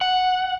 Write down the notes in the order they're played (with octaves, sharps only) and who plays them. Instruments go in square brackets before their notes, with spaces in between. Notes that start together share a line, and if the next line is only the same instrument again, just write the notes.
[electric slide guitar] F#5